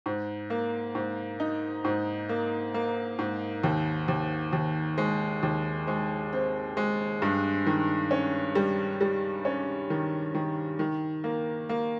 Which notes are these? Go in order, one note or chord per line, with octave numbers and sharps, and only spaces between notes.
G#2
A#3
G#2
D#4
G#2
A#3
A#3
G#2
D#2
D#2
D#2
G#3
D#2
G#3
C4
G#3
G2
D#3
C#4
G3
G3
C#4
D#3
D#3
D#3
A#3
A#3